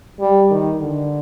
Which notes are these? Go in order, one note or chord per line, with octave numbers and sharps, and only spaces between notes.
G3
D#3
D3